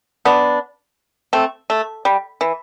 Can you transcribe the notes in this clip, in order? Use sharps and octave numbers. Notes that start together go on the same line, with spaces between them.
B3 D4
A3 C4
A3
G3
E3